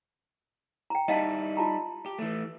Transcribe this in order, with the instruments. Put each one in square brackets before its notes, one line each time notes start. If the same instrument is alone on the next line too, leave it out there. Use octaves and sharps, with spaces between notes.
[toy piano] G5 A#5
[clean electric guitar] G3 D#4 E4 [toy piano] D#5 F5 A5
[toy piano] F4 A5 A#5
[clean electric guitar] G4
E3 A3